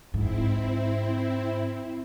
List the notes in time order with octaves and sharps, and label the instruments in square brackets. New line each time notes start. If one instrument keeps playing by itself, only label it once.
[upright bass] G#2 [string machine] C4 E4